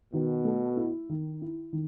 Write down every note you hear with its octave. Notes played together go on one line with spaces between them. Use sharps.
B2 D#3
A3
E4
D#3
E4
D#3